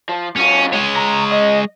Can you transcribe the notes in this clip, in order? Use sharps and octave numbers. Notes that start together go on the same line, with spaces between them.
F3
F#2 C#4 F4
G#3 C#5
A#5
D#5